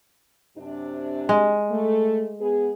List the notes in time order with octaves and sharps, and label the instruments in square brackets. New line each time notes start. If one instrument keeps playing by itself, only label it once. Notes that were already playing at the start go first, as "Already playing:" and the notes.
[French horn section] F#2 C3 D4
[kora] G#3
[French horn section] A3
B3 G#4